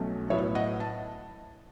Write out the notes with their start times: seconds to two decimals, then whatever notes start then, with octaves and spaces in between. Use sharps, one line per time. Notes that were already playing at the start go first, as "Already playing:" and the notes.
Already playing: B1 B2 F#3 A3 C#4
0.30 A2 F#3 B3 E4 C#5 E5
0.55 D#5 F#5
0.80 A5